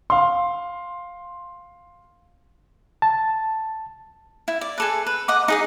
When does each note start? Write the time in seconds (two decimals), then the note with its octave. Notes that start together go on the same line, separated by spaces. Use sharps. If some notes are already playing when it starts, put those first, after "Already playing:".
0.10 F5 C6
3.02 A5
4.48 E4
4.61 D5
4.78 G#4 A4 B4
5.07 B4
5.28 D#5 F#5 D6
5.48 D#4 G#4 D#5